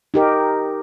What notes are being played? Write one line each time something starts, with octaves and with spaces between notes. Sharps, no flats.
D#4 G4 A#4